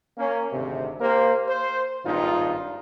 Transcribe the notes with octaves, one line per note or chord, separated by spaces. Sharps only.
A#3 C#4
G#1 D2 C3
A#3 G4 A#4 C5
C5
G#1 G2 A#2 D#4 F4